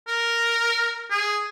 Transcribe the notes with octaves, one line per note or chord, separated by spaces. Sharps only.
A#4
G#4